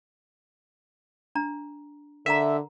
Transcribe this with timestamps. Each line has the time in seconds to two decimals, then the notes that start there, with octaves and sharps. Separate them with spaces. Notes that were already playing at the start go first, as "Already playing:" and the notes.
1.35 D4 A#5
2.26 D3 A#4 E5 F#5 A#5